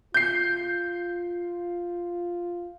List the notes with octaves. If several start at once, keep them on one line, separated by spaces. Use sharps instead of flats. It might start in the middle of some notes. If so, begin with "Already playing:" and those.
F4 G6 C7